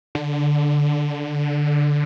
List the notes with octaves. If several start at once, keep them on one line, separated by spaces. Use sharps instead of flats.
D3